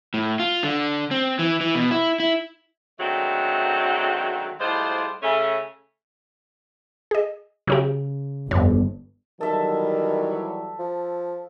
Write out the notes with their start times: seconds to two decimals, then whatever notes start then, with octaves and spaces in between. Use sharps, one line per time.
0.14 A2
0.39 F4
0.63 D3
1.11 C4
1.39 E3
1.61 E3
1.75 B2
1.91 E4
2.20 E4
2.99 D3 D#3 F#3 G#3 A3 C4
4.60 A2 G3 G#3 F4 C5
5.22 C#3 A3 C#4
7.11 G#4 D#5
7.67 C#3 F#3 C#4 G4
8.51 G1 F2 C#5
9.41 D#3 E3 F#3 G3 A4 E5 A5
10.79 F3